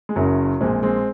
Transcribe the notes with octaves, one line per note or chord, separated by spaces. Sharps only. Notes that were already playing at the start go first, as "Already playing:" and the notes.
G#3
F#1 F#2 C#3 F#3
A#1 A#2 G#3 C4
G#3 C4